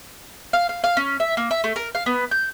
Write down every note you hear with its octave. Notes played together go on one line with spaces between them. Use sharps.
F5
F5
F5
C#4
E5
A#3
E5
A3
A#4
F5
B3
G6